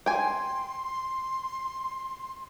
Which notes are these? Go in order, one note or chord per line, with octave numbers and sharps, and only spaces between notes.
G5 G#5 C6